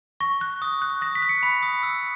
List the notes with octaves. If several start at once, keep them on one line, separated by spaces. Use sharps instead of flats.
C#6 A#6
F#6
D#6
F#6
D#6 A#6
B6
F#6
C#7
B5 B6
D#6
E6